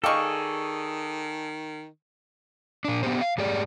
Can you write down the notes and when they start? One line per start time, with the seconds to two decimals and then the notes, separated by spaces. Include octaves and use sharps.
0.04 D#3 G#4 A4 D5 D#5 F5 G5 C#6
2.85 A#2 D4
3.03 B3 D4 G4 C5
3.21 F5
3.38 G#2 G4 G#4 D5